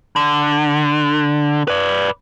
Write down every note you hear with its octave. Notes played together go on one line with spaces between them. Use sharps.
D3
B4 D5